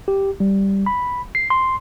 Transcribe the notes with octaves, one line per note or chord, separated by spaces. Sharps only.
G4
G3
B5
C7
C6